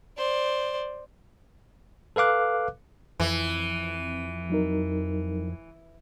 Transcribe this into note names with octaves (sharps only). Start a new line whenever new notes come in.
C5 D5
A4 B4 F5 D6 F#6
F2 E3
F#3 D#4 A#4